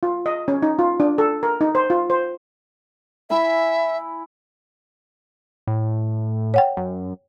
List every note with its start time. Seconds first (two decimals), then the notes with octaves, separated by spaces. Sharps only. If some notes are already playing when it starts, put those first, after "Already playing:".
0.03 F4
0.26 D#5
0.48 C#4
0.62 D#4
0.79 F4
1.00 D4
1.18 A4
1.43 A#4
1.61 D#4
1.75 C5
1.90 F4
2.10 C5
3.30 E4 E5 G#5 B5
5.67 A2
6.54 C#5 F#5 G5
6.77 F#2